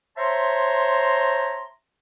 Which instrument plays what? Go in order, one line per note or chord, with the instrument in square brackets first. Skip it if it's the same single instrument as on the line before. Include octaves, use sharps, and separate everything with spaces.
[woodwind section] C5 C#5 E5 A5 A#5 C6